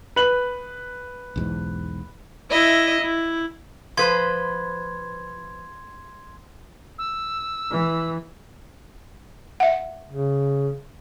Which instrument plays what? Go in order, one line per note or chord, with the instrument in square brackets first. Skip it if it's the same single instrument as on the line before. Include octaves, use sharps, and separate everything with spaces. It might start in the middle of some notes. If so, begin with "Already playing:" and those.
[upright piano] B4 F#7
[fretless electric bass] B1 E2 G#2
[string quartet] E4 D#5 E5
E4
[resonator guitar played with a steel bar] F3 B4 C5 [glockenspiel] C6 G#6
[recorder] E6
[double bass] E3
[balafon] E5 F#5
[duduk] C#3